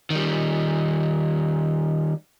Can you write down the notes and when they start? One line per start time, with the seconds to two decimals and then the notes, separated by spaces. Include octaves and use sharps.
0.10 D#3 G3